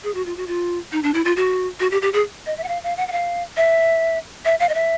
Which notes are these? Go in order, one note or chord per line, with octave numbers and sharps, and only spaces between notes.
G#4
F#4
F4
F#4
F4
D#4
D4
E4
F4
F#4
F#4
G4
G4
G#4
D#5
E5
F#5
F5
F5
F#5
F#5
F5
E5
E5
F5
D#5
E5